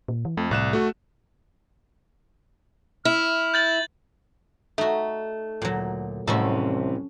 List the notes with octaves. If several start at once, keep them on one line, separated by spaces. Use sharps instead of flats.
A#2
E3
F2 A3
C2 A2 F#6 E7
A3 F#4
E4 F6
G6 A6 F#7
A3 D#4 F#4
D2 A#2 F#3
C2 F2 A2 C3 E3 C#4 F#4 A4